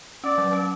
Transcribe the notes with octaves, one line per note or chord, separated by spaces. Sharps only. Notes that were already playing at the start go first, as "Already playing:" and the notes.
C#4 D5
F#3
C#4